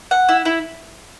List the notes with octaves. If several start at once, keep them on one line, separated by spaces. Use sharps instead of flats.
F#5
E4
E4